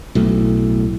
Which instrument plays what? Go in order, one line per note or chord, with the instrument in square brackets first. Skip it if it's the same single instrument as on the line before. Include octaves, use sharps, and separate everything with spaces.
[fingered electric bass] B1 A2